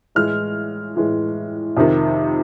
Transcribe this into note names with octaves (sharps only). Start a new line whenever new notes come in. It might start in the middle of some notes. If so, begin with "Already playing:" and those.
A2 E3 G#3 F6
A2 E3 G#3
F2 C3 D#3